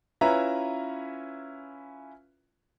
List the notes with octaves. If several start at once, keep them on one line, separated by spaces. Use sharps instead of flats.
C#4 E4 F4 B4 E5 A#5